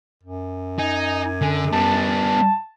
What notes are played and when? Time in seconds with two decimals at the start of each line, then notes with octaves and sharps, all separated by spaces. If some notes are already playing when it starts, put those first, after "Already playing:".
0.24 F#2
0.78 D#4 G#5
1.42 D3
1.73 G3 B3 A5